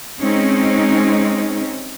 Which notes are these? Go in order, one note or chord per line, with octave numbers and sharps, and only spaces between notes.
G#3 C4 C#4 D#4